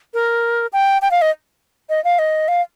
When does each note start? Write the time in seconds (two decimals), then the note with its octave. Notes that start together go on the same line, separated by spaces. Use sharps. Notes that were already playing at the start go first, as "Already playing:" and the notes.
0.14 A#4
0.73 G5
1.02 G5
1.11 F5
1.22 D#5
1.89 D#5
2.04 F5
2.19 D#5
2.48 F5